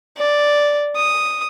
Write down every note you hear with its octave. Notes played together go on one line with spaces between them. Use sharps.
D5
D#6